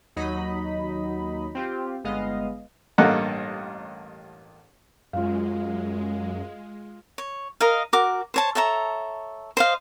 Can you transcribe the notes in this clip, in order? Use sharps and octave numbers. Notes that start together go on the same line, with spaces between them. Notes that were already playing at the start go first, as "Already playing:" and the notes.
D#2 F#3 D#4 D#5 B5
C4 F4 G4
G1 G#3 B3 D#5 F5
A1 G2 A#3 A4 D#5 F#5
F#2 G#3 F4 F5
C#5
A#4 D#5 F5
F#4 A#4 D6
C5 C#5 A5
A4 C#5 E5 A#5
C5 D#5 F5